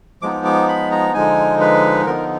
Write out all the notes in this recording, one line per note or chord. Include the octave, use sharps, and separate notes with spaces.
F3 G#3 B3 D#4 D6
D6
B5
A#5
D3 F3 G#3 D#4 G#5
B4
D3 F3 B3 D#4 A#4